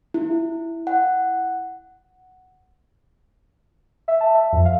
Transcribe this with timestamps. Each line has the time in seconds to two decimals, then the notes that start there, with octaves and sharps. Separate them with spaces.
0.14 E4
0.87 F#5
4.08 E5
4.21 A5
4.35 E5
4.53 F2
4.65 F5